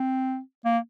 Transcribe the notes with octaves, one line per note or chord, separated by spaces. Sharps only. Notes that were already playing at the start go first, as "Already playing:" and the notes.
Already playing: C4
A#3